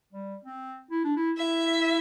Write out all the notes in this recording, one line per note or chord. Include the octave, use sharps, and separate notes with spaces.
G3
C4
E4
D4
E4
E4 E5